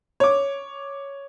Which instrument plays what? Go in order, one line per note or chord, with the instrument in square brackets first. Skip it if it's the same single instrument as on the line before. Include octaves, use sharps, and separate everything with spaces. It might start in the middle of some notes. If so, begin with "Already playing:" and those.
[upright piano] C#5 D6